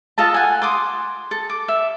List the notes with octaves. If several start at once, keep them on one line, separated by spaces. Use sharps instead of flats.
F4 A4 D#5 A5
F#5 G#5
C6 D6 D#6
A4
D6
E5